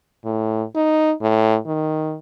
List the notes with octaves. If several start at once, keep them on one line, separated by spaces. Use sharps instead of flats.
A2
D#4
A2
D#3